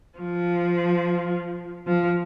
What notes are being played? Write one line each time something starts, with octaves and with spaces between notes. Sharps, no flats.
F3
F3